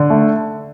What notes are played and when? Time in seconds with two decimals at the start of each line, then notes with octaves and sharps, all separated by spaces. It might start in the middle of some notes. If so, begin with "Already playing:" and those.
Already playing: D3
0.10 A3